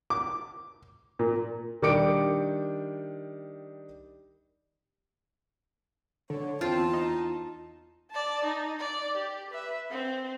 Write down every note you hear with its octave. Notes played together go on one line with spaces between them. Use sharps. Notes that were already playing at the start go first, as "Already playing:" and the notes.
D6
A#2
D#3 G3 D4 D6 C#7 D7
D3 C#5
E2 C4 F4 A5
D#4
D5 A5
D#4
D5
G4
B4 E5
C4